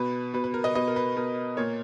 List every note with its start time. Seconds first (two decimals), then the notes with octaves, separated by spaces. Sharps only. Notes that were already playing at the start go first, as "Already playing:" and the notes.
Already playing: B2 B4
0.34 B2 B4
0.44 B4
0.54 A#4
0.64 B4 D#5
0.75 B2 B4 D#5
0.88 A#4
0.96 B4
1.17 B2 A#4
1.57 A#2 A#4 C#5